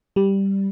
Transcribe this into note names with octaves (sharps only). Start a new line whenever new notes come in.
G3